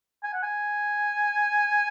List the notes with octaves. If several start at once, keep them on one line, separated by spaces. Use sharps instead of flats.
G#5
F#5
G#5